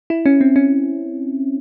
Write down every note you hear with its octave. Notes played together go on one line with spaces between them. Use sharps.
E4
C#4
C4
C#4